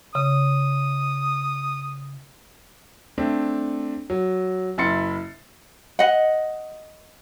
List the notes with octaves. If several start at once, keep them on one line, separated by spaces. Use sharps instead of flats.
C#3 D#6
A3 C4 D4
F#3
F#1 E4 C6 A6 C7 C#7
D#5 F#5